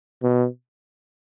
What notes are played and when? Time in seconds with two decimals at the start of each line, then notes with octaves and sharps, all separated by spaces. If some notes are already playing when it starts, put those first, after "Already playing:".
0.23 B2